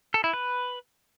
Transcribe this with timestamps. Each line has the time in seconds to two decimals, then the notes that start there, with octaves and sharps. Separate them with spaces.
0.14 A4
0.24 E4
0.34 B4